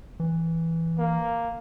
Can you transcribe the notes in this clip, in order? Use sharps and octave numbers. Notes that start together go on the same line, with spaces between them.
E3
A#3